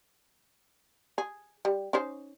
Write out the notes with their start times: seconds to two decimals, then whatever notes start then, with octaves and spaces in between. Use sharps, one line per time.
1.18 G#4
1.65 G3
1.93 C#4 D#4 C5